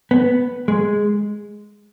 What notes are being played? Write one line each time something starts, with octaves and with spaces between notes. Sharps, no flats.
B3
G#3